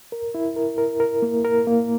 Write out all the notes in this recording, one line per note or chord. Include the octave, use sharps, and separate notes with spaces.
A#4
E4
A#4
A#4
A#4
A#3
A#4
A#3